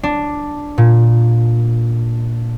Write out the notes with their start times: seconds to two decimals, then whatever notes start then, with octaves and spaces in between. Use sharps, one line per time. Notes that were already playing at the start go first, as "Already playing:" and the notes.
0.03 D4
0.78 A#2